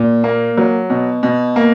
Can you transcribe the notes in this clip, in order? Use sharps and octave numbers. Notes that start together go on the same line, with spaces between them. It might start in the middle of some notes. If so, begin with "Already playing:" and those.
Already playing: A#2
A#3
F#3
B2
B2
A#3